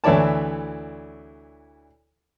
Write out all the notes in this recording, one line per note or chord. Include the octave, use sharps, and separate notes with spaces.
D2 E3 E4 C#5 D5 A5